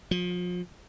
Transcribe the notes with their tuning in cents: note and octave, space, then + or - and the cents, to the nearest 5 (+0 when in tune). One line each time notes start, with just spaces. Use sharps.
F3 +35